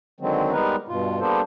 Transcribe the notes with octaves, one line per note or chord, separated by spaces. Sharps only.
D3 D#3 F#3 G#3 C4
G3 G#3 B3 D#4 A#4 B4
G2 B2 F4
G3 A#3 B3 D4 A4 C5